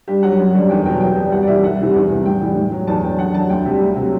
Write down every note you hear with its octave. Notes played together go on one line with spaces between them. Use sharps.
G2 G4
F#3 F#5
F#2
D3 G3
E2 G5
B2 F#3 G5
C2 G5
B2 G3
C2 F#5
D5
C3 E3 G3 E5
C2 F#5
C3 E3 G3
E2
C3 E3
A2 G5
E3 G3
A2
F#3
E2 A5
D3 F#3 G5
F#2 F#5
D3 F#3 A5
D2 G5
C3 G3
D2
C3 F#3